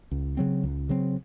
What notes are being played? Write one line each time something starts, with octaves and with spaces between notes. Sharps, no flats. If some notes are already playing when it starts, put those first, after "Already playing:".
C#2
C#3 F#3 C4
C#2
C#3 F#3 C4